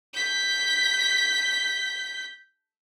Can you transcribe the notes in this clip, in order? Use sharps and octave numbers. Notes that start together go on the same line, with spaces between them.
G6 B6